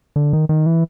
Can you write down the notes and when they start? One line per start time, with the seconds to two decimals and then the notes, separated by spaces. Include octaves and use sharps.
0.16 D3
0.33 D#3
0.49 D#3
0.66 E3